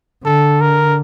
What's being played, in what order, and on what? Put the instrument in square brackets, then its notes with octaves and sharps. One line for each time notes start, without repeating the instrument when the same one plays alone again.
[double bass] D3 [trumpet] A4
[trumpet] A#4